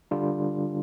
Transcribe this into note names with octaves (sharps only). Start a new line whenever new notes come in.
D3 G3 D4 F4